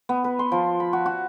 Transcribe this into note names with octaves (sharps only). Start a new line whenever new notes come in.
B3
B4
C6
F3
B5
F#4
F#4